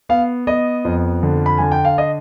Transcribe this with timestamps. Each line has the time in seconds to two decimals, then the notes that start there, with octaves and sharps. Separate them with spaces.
0.09 B3 F5
0.47 B3 D#5
0.85 F2
1.23 D3
1.46 B5
1.58 D3 G#5
1.72 G5
1.85 F5
1.98 D#5